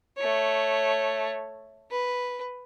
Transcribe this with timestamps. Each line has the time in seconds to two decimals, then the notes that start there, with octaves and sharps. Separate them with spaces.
0.17 A3 C#5
1.91 B4